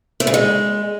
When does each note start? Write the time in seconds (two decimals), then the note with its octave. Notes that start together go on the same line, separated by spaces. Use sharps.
0.20 A3
0.27 C#3
0.34 G#3